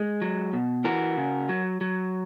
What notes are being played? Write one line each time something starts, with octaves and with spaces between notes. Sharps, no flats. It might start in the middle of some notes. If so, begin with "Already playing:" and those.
Already playing: G#3
F#3
B2
E3 F#4 A#4
C#3
F#3
F#3